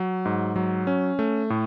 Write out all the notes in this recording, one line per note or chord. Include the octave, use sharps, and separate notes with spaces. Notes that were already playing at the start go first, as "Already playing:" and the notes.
Already playing: F#3
G#2
F#3
C#4
A3
A2